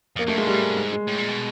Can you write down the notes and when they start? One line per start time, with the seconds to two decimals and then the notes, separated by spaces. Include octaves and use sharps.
0.16 F2
0.19 A#3
0.27 F2 A3
0.36 F#2 G#3
0.46 G#2 G3
0.54 A2
0.62 G#2
0.77 G#3
0.93 G#3
1.07 A2
1.18 A#2
1.28 B2